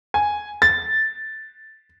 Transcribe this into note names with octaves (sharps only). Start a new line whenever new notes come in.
G#5
A6